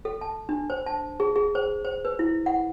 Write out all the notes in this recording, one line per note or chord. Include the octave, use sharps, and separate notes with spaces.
A4
A5
D4
C5
A5
G#4
G#4
C5
C5
B4
E4
F#5